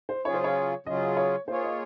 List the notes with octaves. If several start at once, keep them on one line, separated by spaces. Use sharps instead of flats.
C5
C#3 F#3 C#4 F4 G#4 C#5
C5
C#5
C#3 F#3 C#4 F4 G#4 D#5
C#5
A#3 F4 G#4 C5 C#5
D#5